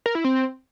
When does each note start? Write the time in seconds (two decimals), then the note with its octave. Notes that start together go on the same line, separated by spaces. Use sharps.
0.06 A#4
0.15 E4
0.24 C4